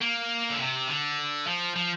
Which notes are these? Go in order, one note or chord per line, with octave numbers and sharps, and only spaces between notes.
A#3
D3
C3
D3
F3
F3